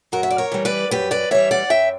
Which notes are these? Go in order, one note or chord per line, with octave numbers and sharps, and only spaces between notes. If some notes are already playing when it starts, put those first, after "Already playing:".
F#2 F#4 A#4
E5
D5
A#4 C#5
E3 G3
B4 D5
F#2 G4 B4
B4 D5
E3 G3 C#5 E5
D5 F#5
F#2 E5 G5